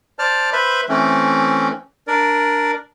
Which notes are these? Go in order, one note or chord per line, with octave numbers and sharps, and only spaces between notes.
C5 D5 A5 F6
B4 C5 E5 B5
E3 A3 C4 C#4
D4 A#4 D5